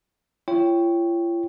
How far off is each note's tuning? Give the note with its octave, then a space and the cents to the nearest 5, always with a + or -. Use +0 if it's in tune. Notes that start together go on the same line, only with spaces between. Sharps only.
F4 -45 C#5 +0 G5 +0